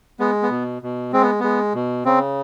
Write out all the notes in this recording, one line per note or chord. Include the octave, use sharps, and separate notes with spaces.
G#3 B3
B3
B2
B2
G#3 C4
B3
G#3 B3
B2
C#3 C4